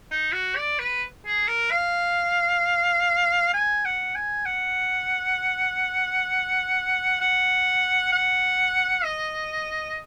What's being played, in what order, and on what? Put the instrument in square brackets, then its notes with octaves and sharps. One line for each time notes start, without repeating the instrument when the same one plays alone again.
[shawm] D#4
F#4
D5
B4
G#4
A#4
F5
G#5
F#5
G#5
F#5
F#5
F#5
D#5